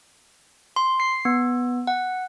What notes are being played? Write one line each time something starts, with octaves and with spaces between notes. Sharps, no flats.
C6
C7
B3
F#5